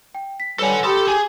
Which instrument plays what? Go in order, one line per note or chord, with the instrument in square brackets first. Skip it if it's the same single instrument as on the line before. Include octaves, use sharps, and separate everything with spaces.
[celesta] G5
B6
[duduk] G3 [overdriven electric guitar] A4 F#5 [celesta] B4 C#5 G#5
[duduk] G4 [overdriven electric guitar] A4 [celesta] B5 C6 D#6
[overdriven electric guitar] G#4 [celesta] G#5